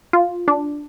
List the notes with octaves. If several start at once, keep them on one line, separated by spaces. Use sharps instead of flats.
F4
D4